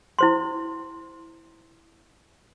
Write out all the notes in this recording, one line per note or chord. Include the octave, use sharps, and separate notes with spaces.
E4 C5 C6